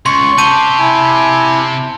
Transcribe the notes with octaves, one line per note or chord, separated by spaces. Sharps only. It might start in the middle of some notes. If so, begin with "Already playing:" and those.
C#2 C6 C#6
C3 G4 A5 G6 D#7
E4 G#5